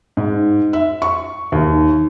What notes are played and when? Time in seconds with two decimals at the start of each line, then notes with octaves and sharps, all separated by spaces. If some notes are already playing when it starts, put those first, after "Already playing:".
0.17 G#2
0.73 E5
1.02 C#6
1.52 D#2